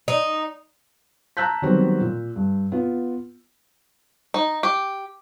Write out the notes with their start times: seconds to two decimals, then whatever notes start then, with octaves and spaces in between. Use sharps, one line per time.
0.08 D#4
1.37 A5 A#5 E6 F#6 G6 B6
1.62 D#3 F#3 G3 B3 C4
2.01 A#2
2.36 G2
2.72 B3 F4
4.34 D#4
4.63 G4